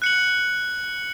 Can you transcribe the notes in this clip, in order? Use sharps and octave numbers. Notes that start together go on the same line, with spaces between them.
F#6 C#7 F#7